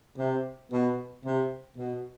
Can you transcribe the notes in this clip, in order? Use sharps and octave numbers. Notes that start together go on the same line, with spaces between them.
C3
B2
C3
B2